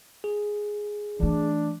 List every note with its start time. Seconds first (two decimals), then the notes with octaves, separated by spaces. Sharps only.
0.24 G#4
1.20 E3 A3 D4